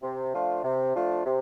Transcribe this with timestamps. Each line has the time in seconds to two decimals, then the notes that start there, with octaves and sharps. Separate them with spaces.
0.01 C3
0.32 F3 A3 D4 F4
0.63 C3
0.94 F3 A3 D4 F4
1.24 C3